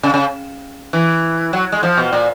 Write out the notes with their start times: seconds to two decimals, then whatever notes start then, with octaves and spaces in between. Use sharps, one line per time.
0.03 C#3
0.14 C#3
0.93 E3
1.53 F#3
1.72 G#3
1.83 F3
1.97 B2
2.13 A#2